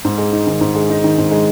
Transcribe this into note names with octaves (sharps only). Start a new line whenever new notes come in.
G#2
G#3
D#4
D#3
G#2
G#3
D#4
D#3
G#2
G#3